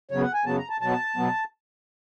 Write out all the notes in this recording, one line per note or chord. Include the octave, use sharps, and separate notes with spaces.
F#2 C#3 F#3 B3 C#5
F#5
G#5
F#2 C#3 F#3 B3 A5
A#5
A5
B2 F#3 B3 A5
B2 F#3 B3